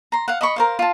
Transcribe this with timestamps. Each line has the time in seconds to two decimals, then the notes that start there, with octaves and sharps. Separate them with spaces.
0.12 A#5 C6
0.28 F5 F#5
0.41 D#5 B5 C#6
0.56 A#4 C5 F5
0.79 F4 A5